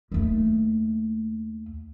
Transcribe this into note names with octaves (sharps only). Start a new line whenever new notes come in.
D#2 A3